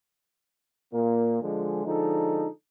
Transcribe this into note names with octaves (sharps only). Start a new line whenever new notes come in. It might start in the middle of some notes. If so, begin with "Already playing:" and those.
A#2 A#3
D3 F3 G#3
D3 F3 G#3 D#4 A4